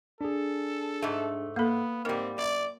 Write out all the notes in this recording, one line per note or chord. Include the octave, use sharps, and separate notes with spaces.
D4 G#4 A4
G#2 A3
A#3 B3 A4 F5 B5
G#2 G3 C4 A#4
F#2 D5